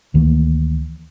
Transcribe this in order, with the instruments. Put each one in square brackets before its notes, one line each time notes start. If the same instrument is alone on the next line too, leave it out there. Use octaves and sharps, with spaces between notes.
[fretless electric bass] D2 D#3 E3 A#3